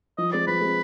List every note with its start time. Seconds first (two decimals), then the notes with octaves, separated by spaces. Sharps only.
0.18 F3 D#5
0.32 G#3 C4 D5
0.47 F3 B4
0.61 G#3 C4